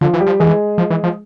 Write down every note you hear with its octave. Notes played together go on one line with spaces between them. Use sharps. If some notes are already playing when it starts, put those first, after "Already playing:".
D3 F3 F4
E3
G3 G4
F3
E3 G#3 G#4
F3
E3
F3